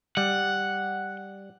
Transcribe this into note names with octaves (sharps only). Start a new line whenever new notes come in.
G3 F#5